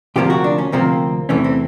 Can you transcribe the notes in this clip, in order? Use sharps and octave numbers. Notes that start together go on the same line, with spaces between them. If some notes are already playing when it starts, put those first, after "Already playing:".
D2 C3 F3 A#3 G4
F#4
D4
C#4
D2 C3 F3 A#3 C4
E2 C3 E3 A3 C#4
C4